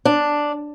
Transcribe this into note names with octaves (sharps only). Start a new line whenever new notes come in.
D4